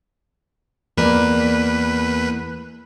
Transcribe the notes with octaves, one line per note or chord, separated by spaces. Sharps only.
E2 A#3 B4 D5